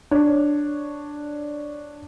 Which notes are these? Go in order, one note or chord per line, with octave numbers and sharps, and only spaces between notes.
D4 C#5